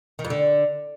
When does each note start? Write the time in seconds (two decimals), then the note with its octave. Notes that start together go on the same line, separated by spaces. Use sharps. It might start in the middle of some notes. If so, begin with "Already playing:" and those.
0.19 D#3
0.25 F2
0.30 D3